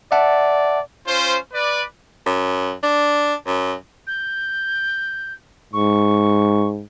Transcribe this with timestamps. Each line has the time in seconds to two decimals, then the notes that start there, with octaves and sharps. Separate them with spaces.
0.12 D5 E5 F#5 A5
1.07 C#4 F4 C5
1.54 B4 D5
2.26 F#2
2.83 D4
3.47 F#2
4.07 G6
5.73 G#2 C#6